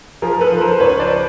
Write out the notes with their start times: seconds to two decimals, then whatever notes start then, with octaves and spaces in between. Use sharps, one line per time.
0.22 F3 G#4 A#4
0.32 A#4
0.41 A4 B4
0.52 F3
0.60 A#4 C5
0.73 C5
0.80 C#2 B4 C#5
1.00 C5 D5